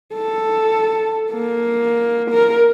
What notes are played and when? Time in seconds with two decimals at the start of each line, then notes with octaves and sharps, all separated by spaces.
0.15 A4
1.32 A#3
2.31 A#4